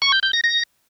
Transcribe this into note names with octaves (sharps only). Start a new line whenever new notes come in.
C#6
G6
G6
A#6
A#6